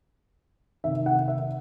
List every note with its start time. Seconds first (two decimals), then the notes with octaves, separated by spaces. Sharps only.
0.84 C3 D#3 E5
1.06 F#5
1.28 E5